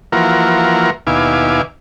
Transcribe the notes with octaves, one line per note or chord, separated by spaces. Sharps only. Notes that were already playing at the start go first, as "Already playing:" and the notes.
E3 F3 A#3 F#4 A#4
D#2 B2 E4 F5 G#5 D6